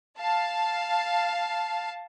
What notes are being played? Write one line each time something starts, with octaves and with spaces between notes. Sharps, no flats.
F5 A5